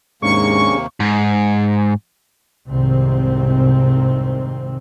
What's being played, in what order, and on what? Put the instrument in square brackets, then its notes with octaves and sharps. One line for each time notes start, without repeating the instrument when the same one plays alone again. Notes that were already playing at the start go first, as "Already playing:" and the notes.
[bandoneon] D#2 C3 A#3 [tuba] G#2 [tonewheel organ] C#4 D4 G#4 [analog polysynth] C#6
[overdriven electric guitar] G#2
[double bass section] F1 C2 G#2 C3 D#3 C4